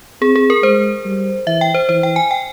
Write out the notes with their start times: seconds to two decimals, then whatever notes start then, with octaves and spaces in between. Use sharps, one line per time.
0.22 C4 G#4
0.36 G#4
0.50 A#4
0.63 G#3 C5
1.05 G3
1.47 E3 E5
1.61 G5
1.74 C5
1.89 E3 C5
2.03 G5
2.16 G#5
2.31 G5